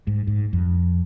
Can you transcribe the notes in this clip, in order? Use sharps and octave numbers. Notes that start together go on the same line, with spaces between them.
G#2
G#2
F2